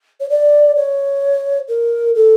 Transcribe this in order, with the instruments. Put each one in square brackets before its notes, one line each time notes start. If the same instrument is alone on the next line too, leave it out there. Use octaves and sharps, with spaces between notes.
[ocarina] C#5
D5
C#5
A#4
A4